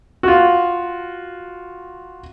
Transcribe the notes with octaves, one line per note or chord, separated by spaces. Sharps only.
F4 F#4